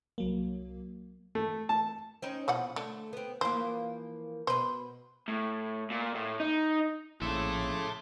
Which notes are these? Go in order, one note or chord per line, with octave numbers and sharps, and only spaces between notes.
C2 F#3 A#3
A3
A5
C4 C#4 D#4
B2 E3 F3 F#5
D3 A3
B3 C4
E3 F3 A#3 C5
B2 B4 C5
A2
A#2
A2
D#4
A#1 A2 C#3 E4 A4 E5 C6 D6